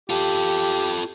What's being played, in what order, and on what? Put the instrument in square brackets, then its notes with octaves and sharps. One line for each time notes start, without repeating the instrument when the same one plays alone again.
[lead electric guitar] F4 A4 [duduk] G4